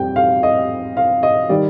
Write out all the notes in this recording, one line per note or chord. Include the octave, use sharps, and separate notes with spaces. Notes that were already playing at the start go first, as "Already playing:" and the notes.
Already playing: F2 G3 G5
F5
D#5
F5
D#5
D#3 G3 D5